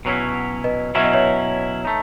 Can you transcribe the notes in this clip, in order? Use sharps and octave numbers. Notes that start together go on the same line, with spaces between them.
B2 F#3 C#4 E4
B4 D#5
B2 F#3 C#4 E4 E5
D#5
C#5 E5
A3 D#4